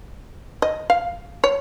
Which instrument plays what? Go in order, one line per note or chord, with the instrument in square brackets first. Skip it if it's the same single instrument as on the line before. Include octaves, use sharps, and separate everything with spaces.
[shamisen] D#5
F5
C#5